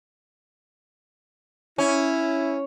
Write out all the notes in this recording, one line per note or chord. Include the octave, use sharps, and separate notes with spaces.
C#4 E4